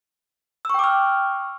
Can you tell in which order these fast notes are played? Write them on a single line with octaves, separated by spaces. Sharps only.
E6 C#6 G5 D6 F6